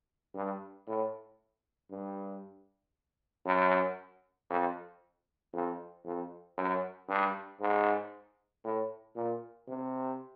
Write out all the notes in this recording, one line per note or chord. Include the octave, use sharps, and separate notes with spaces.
G2
A2
G2
F#2
F2
F2
F2
F#2
G2
G#2
A2
A#2
C3